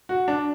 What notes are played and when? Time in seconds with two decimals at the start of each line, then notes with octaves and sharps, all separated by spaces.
0.09 F#4
0.28 D4